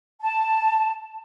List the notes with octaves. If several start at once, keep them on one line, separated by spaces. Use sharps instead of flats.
A5